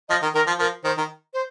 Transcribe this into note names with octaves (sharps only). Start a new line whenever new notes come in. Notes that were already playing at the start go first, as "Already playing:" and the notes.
F3 D#5
D#3
D#3 A#4
F3
F3 A#4
D#3 C5
D#3
C5